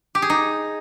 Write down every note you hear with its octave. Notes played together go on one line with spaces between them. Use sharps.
G4
G#4
D#4